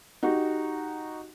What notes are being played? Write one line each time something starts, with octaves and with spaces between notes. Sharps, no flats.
D#4 F#4 G4